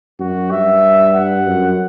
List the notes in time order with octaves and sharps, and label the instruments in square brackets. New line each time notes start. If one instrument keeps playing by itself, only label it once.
[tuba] F#2 [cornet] F#4
[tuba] G2 [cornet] E5
[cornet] F#5
[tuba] F#2